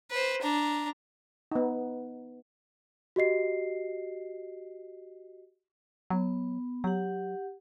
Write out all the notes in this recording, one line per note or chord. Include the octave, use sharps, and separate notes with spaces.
B4 C5
D4 A#5
B3 D#4
F#4 G4 D#5 C7
F#3 B3
F#3 G4 F#5